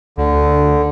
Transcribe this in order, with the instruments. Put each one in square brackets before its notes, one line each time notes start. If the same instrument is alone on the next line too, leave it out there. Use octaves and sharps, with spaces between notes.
[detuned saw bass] D2 [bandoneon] D3